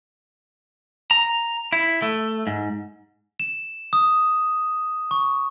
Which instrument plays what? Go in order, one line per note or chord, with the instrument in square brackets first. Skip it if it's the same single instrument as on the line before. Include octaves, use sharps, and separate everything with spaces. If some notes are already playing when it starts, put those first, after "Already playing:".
[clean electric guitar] A#5
E4
A3
G#2
[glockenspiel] E7
D#6
C#6